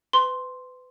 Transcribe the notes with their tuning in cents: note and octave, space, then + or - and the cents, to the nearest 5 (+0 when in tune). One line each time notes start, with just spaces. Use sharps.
B4 +30 C6 +0